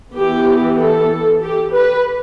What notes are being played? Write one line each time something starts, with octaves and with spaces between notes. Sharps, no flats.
E3 B3 G4
A4
G4
B4